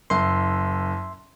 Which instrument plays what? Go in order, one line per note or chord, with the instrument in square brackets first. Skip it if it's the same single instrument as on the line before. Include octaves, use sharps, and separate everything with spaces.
[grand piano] F#1 [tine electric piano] E5 C6